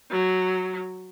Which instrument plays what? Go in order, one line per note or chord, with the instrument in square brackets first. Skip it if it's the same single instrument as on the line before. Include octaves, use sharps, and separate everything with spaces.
[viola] F#3